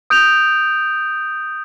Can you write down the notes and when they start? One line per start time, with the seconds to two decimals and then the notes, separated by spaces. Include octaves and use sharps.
0.10 D#6 G6 D7 F7